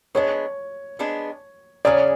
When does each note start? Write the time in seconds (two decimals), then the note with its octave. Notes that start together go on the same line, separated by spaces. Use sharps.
0.15 G#3 B3 D4 C#5
0.99 G#3 B3 D4
1.85 C#3 F#3 C#4 G#4 D5